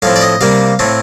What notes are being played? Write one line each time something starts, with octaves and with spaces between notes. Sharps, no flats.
A2 F3 C4 F5
D5
D#5
C3 G3 A#3 F5
A2 A3 C4